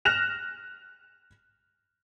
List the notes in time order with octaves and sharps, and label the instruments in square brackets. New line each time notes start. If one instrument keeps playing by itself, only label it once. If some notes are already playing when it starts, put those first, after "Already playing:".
[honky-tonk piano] F6 F#6 A#6 E7 F7